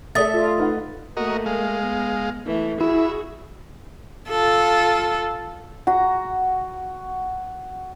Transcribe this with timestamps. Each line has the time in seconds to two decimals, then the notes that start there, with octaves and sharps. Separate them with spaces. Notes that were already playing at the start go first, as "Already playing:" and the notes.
0.15 A3 A4 D5 E5 D#6 A6
0.34 F4
0.58 D#4 B4 F#5
1.17 A3 A#3 F#4 A#4 D#5
1.46 G#3 F5
1.79 B3
2.46 E3 A3
2.81 E4 F#4 G#4 E5
4.29 F4 A4
5.87 F#4 F#5 A#5